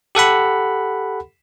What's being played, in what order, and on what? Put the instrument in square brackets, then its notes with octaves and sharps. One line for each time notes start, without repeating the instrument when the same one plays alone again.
[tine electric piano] G4 A4 F#5 B5